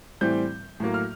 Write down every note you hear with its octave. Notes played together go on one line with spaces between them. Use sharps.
A2 E3 G3 C4 G6
A2 F#3 A#3
F6